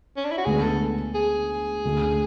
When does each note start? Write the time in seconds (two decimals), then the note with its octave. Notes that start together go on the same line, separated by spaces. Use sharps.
0.17 C#4
0.24 D4
0.32 E4
0.38 F#4
0.45 D2 D3 G#3 B3 D4 G#4
0.63 A4
1.15 G#4
1.85 D2 D3 A3